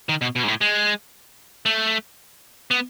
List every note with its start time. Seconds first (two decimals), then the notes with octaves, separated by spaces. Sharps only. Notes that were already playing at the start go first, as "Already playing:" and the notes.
0.09 D#3
0.21 B2
0.36 B2
0.43 G#2
0.48 A2
0.61 G#3
1.66 A3
2.71 B3